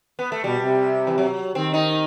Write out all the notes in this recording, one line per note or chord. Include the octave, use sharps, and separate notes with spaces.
B3
A3
B2 G3
C3
E3
F#3
D#3 C4
D#4